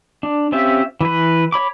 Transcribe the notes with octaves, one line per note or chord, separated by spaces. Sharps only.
D4
C4 C#4 F4 G4 E5
E3 B4
C#5 B5 D6